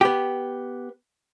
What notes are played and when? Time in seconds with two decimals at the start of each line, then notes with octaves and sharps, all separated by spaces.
0.01 B3 G4